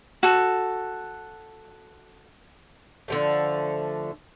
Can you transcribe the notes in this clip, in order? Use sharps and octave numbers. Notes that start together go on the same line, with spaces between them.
F#4 A4
D3 F3 A3